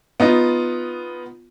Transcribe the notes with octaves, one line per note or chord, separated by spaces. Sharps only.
B3 D#4 F4